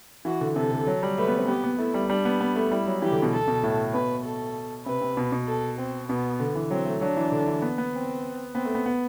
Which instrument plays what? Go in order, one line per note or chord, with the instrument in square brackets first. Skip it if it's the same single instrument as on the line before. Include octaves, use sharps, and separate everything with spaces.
[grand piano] E3 [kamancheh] F#4
[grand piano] D3
[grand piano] C3 [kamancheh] A4
[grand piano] D3
F#3
G3
[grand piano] A3 [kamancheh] B4
[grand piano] B3
C4
[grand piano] B3 [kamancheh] G4
[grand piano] B3
[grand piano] A3 [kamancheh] E4
[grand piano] G3
[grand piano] G3 [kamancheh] D4
[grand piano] B3
B3
A3
[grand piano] G3 [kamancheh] E4
[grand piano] F#3
[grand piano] E3 [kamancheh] G4
[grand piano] D3
B2
[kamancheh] A4
[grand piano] B2
A2
[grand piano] B2 [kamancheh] B4
[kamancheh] A4
[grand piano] C3 [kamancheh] B4
[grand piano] C3
B2
B2
[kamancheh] A4
C4
[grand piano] B2 [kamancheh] B3
[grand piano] D3
E3
[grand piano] F#3 [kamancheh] C4
[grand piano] A3
[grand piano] F#3 [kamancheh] D4
[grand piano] E3
D3
E3
B3
B3
[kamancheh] C4
[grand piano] B3 [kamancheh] C4
[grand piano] A3
B3
B3